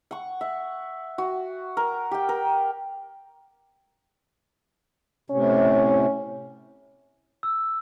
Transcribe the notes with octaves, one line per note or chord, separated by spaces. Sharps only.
F#5 C#6
E5
F#4
A#4
G4 G5
A#4
A2 C3 C#4
E6